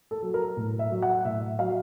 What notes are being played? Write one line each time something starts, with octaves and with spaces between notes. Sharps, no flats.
A4
F#3
A#4
A2
E5
F#3
F#5
A2 E5
F#3 F5